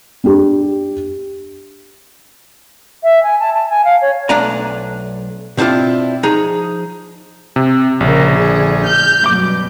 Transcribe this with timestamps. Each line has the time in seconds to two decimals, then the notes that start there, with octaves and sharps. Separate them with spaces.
0.24 D4 G4
3.03 E5
3.23 G#5
3.39 A5
3.54 A5
3.70 G#5
3.84 F5
4.01 C#5
4.29 B1 A3 D4 D5 G#5 A#5
5.57 B2 C4 D4 E4 F4
6.23 F3 D#4 G#4 A#5
7.56 C3
8.00 A#1 C#3 A#4
8.34 D3 G#4
8.85 F6 G6
9.26 F#2 B2 G3 D6